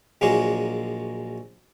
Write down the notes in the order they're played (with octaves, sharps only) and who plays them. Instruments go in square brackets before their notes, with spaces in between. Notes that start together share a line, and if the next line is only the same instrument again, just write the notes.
[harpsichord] A#1 F#3 G#3 A#3 G#4 C#5